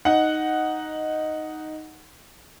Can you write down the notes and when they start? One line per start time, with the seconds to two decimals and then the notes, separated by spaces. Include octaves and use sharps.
0.05 D#4 F#5